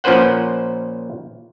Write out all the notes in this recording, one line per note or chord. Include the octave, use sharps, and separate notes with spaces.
A#2 F3 C#4 B4 C5 F#5